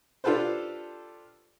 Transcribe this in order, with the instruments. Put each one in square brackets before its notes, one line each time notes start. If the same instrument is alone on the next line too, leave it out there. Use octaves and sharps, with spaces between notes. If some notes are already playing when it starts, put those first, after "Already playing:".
[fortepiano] D4 F4 G4 A4 B4 C5